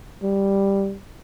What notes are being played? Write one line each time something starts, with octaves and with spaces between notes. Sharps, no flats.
G3